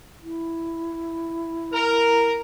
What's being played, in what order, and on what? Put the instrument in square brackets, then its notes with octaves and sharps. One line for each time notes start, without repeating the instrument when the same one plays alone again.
[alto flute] E4
[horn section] A#4